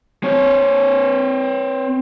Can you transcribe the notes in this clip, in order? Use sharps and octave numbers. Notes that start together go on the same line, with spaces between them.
C4 C#5